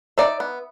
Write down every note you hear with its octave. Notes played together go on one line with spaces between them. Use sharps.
D#4 D5 E5
B3